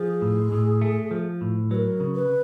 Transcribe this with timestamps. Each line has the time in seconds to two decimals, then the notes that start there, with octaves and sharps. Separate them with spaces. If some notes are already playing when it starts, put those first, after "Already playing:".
Already playing: F3 G#4
0.22 A2
0.52 A2
0.82 A3
1.11 F3
1.41 A2
1.71 F#3 A#4 B4
2.00 C#3
2.15 B4